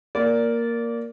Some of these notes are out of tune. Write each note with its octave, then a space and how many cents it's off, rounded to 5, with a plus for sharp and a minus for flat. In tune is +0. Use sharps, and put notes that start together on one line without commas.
A#3 +0 D5 -20